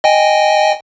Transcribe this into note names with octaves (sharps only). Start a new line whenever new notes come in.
D#5 G5 G#5